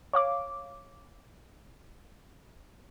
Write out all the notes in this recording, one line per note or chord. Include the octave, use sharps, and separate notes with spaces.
C#5 F5 D6